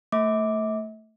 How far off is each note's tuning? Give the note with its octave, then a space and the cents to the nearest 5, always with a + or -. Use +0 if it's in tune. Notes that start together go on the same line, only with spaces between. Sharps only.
A3 +15 E5 -45 D6 +0